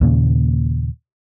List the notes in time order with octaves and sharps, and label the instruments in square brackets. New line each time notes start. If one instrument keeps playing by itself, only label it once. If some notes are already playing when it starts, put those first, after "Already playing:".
[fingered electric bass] D#2 A#2 C#3